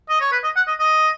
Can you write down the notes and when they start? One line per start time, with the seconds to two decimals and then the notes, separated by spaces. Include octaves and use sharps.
0.09 D#5
0.21 C#5
0.32 B4
0.43 D#5
0.56 F#5
0.68 D#5
0.79 D#5